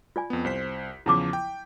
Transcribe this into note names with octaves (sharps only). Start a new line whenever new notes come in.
F4 D5 G#5
F2 B3
C2 C5 B6
E2 C#3 F3 E4 A5 D6
G5